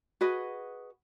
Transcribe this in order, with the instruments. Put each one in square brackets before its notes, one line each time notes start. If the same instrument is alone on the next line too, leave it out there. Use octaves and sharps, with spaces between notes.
[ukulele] F#4 G#4 B4 D#5